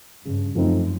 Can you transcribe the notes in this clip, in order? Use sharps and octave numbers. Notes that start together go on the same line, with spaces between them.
G2 C#3
F#2 F3 A3 C4 D#4